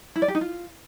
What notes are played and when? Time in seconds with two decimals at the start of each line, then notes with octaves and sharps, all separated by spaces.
0.16 E4
0.22 D5
0.28 G4
0.35 D#4
0.41 F4